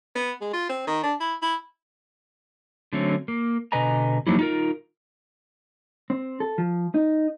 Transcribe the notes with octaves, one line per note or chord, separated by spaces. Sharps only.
B3
G#3
F4
C4
D#3
D4
E4
E4
D3 F#3 A3 C4 C#4
A#3
B2 D3 B4 D#5 G#5 A#5
F3 F#3 A#3 D#4 E4
D#4 F4 A#4
C4
A4
F3
D#4